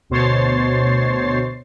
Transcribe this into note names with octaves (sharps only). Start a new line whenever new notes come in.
D2 B2 C5 C#5 A6 C7